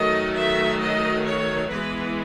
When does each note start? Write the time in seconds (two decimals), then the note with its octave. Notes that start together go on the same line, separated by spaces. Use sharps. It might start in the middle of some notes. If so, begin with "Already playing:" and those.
Already playing: D#3 F#3 A3 D#5
0.37 E5
0.81 D#5
1.26 C#5
1.70 E3 G#3 B3 B4